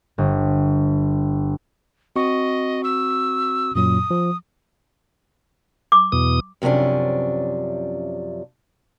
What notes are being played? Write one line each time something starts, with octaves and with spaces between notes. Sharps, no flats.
G1
C4 F#4 D#5 C#6
E6
F#2 A#2 F#3 D#6
F3
D6
E2 B2 D#6
F#2 C3 F3 C#4 D4